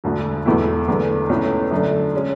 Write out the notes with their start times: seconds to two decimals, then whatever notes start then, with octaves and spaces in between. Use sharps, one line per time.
0.04 E1 D2 D3
0.46 E1 E2 B2 A3 E4
0.87 F#1 E2 D3 A3
1.29 C#2 B2 A3 C#4 E4
1.71 F#2 D3 A3 D4 A4
2.15 G#3 C#4